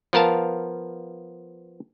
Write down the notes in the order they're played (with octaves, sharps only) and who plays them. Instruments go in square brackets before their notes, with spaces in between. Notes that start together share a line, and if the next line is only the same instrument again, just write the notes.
[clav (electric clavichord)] F3 B3 A#4 F5 A5